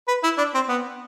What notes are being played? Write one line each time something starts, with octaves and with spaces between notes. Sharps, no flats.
B4
E4
D4
C4
B3